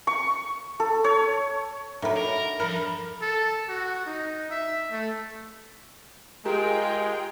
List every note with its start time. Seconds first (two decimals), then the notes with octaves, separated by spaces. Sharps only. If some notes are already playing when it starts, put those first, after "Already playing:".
0.07 C#6
0.80 A4
1.04 C#5
2.02 D#3 F#3 D4 A4 C#5 E5 B5
2.17 A#4
2.60 G2 F3 A#4 B5
3.22 A4
3.68 F#4
4.06 D#4
4.50 E5
4.91 A3
6.45 G#3 F4 G4 G#4 A#4 G5 A#5